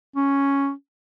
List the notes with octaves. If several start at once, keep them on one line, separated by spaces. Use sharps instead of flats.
C#4